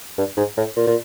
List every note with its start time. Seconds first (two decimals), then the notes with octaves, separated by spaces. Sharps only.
0.18 G2
0.37 G#2
0.57 A2
0.77 A#2
0.87 A#2